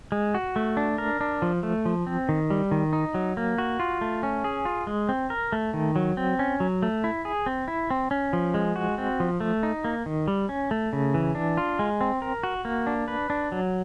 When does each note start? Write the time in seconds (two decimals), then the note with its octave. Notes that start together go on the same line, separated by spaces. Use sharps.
0.12 G#3
0.34 F#4
0.56 A3
0.77 D4
0.98 A#4
1.21 D4
1.42 F3
1.63 A3
1.85 F3
2.07 C4
2.29 D#3
2.50 G3
2.71 D#3
2.93 D#4
3.14 F#3
3.37 A#3
3.58 F#4
3.80 F4
4.01 A3
4.23 C#4
4.44 G#4
4.65 F4
4.87 G#3
5.09 C4
5.30 A#4
5.52 A3
5.74 D#3
5.96 F#3
6.17 C4
6.39 C#4
6.60 F#3
6.83 A3
7.04 E4
7.25 G#4
7.46 C4
7.68 E4
7.90 C4
8.11 C#4
8.33 F3
8.54 G#3
8.76 F#4
8.98 C4
9.20 F3
9.40 A3
9.63 D#4
9.84 A#3
10.06 D#3
10.28 G3
10.49 C#4
10.71 A3
10.93 C#3
11.14 E3
11.35 D4
11.57 F4
11.79 G#3
12.01 C4
12.22 A#4
12.43 F#4
12.65 A#3
12.87 D4
13.08 B4
13.30 D4
13.52 F#3